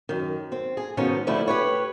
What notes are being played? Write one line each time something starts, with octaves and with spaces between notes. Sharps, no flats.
F#2 D#3
C4
G#4
G#2 B2 D#3 F3 C#4 D#4
D3 F3 G3 A3 E4
G4 B4 C#5